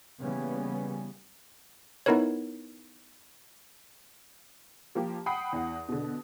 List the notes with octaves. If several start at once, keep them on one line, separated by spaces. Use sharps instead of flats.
C#3 E3 G3 A#3 B3 C#4
B3 D#4 E4 A#4 B4 C#5
F3 A#3 G4
F#5 G5 B5 D#6 C7
E2 F#5
B2 D3